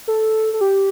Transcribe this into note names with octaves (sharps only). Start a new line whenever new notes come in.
A4
A4
G4